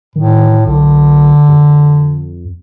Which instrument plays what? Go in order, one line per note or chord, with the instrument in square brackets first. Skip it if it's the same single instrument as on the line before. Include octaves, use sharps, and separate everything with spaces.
[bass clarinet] A2 [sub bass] D#3
[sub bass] B1 [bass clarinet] D3
[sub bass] F2